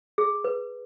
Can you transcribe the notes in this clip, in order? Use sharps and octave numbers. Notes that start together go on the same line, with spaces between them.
G#4
B4